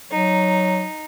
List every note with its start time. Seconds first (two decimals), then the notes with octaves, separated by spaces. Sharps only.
0.12 F#3 D#4